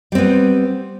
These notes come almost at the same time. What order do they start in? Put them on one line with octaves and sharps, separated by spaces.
G3 C4 B3